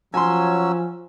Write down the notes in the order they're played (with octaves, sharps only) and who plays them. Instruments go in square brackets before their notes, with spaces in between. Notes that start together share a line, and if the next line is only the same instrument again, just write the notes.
[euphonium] F3 [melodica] F#3 C#4 E6 [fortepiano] G#5 C6